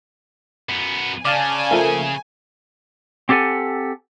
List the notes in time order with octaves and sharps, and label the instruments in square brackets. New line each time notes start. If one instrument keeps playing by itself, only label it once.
[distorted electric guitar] F#2 B3
[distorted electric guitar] C#3 [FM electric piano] D5 F5 A5 [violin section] G#5
[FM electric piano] F3 A3 A#3
[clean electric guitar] C4 G4 A4 F#5 G#5